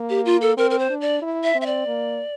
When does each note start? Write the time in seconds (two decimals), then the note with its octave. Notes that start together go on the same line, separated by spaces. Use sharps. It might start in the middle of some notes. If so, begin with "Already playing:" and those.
Already playing: A#3
0.10 G4
0.25 F4
0.41 A4
0.57 C4 A#4
0.70 A#4
0.79 C5
0.90 D4
1.01 D5
1.22 E4
1.44 E5
1.55 C4
1.61 E5
1.66 D5
1.87 A#3